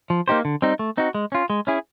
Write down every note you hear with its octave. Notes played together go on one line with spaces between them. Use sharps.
F3
A#3 D#4 G4 C5
D3
G3 C4 D#4
A3
C4 D#4 F#4
G#3
C#4 F4
G#3
C#4 E4 G#4